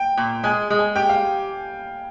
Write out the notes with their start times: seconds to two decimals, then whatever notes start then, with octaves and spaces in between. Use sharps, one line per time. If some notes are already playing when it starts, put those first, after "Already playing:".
Already playing: G5
0.17 A#2
0.44 G#3 G#5
0.70 G#3
0.79 G#5
0.96 G4 G5
1.09 F5